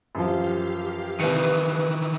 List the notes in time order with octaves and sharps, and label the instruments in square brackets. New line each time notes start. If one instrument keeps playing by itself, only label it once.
[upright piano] F#2 E3 F3 [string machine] G4 F5
[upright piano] C2 C#7 [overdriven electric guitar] D#3 E3 [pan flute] B4